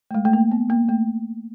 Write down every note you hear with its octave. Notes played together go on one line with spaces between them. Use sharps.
A3
G#3
A3
A#3
B3
A#3
A3